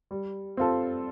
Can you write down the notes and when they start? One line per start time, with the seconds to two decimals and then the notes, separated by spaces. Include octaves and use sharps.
0.11 G3
0.57 C4 F4 A4